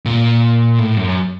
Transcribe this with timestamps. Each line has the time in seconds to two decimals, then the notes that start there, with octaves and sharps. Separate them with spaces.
0.06 A#2
0.79 A2
0.97 F#2